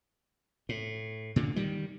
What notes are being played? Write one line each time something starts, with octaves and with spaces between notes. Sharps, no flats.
A2
A#2 D3
D#3 G3